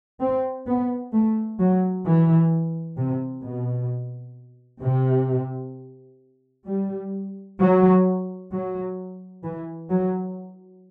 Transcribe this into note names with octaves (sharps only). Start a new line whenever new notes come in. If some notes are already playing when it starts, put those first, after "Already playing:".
C4
B3
A3
F#3
E3
C3
B2
C3
G3
F#3
F#3
E3
F#3